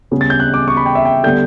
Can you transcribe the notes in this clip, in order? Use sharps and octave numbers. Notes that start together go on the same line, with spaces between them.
C#3 G3 B3
A6
G6
F#6
D6
C#6
B5
G5
E5
G5
D3 G3 B3 G6